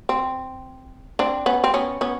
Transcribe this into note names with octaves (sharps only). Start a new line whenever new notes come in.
C4
C4 D4
B3 C#4
C4
B3 C#4
B3 C#4